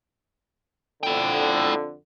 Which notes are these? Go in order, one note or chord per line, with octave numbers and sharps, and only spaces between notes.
F2 D3 E4 G5